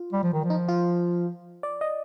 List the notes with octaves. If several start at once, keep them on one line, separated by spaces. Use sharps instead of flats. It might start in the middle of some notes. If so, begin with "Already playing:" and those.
Already playing: F4
G3
F3
D#3
F3
D#4
F4
D5
D#5